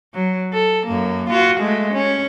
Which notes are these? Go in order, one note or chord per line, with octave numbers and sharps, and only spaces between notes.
F#3
A4
F#2 A#3
F4 F#4
G#3 A3
C#4